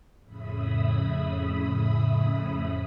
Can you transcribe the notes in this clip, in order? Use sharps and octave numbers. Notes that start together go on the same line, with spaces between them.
F2 A2 C#3 E5 B5 D#6